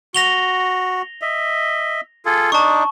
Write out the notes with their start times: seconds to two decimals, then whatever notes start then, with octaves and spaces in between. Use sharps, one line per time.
0.15 F#4 A#6 F7 G7
1.22 D#5 E5
2.25 F4 G#4 A4
2.52 D4 D#4 A5 C#6